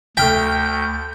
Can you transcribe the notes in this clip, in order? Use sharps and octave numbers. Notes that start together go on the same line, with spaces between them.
D2 A3 G5 F6 G6 B6